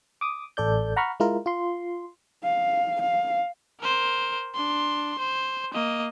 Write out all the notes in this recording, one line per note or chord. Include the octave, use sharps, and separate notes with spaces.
D6 D#6
A1 A4 D5 G6
F#5 A#5 B5 C#6 F6
G#3 E4 F4 A#4
F4 C6
F5
F5
A#4 C5
D4 C6
C5
A#3 D#5